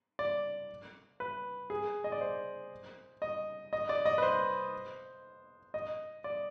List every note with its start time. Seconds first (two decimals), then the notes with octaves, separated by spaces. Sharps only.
0.19 D5
1.20 B4
1.70 G#4
2.04 D#5
2.12 D5
2.21 C5
3.22 D#5
3.73 D#5
3.89 D5
4.05 D#5
4.18 B4
4.22 C5
5.74 D#5
6.24 D5